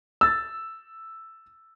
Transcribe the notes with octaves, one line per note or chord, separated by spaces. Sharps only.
E6 A6